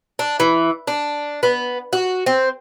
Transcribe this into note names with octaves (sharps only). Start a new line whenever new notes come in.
D4
E3
D4
B3
F#4
C4